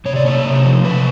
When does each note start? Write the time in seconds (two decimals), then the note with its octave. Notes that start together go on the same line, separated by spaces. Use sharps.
0.05 C3 C#5
0.16 D5
0.25 A#3 C#5
0.45 C3
0.65 F3
0.84 C3 B4